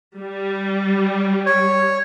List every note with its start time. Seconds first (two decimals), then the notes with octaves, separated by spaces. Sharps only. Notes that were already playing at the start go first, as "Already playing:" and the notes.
0.18 G3
1.46 C#5